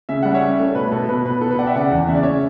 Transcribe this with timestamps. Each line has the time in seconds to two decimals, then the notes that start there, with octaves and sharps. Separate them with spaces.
0.09 C#3 E5
0.23 G3 F#5
0.34 C#5 E5
0.42 C#4
0.60 A3
0.75 B2 B4
0.92 B2 A4
1.09 B2 B4
1.25 B2 B4
1.41 B2 A4
1.50 B4
1.59 B3 D5 F#5
1.66 E5 G5
1.74 C#3 D5 F#5
1.91 E2
2.08 C#3 E5
2.15 D5
2.22 C#3 C#5 E5